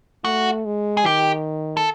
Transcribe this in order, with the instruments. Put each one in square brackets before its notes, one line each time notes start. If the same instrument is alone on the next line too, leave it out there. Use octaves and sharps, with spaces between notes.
[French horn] A3 [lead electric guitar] F#4
[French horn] G#3
[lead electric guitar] G#4
[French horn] D#3 [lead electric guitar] G4
[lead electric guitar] A4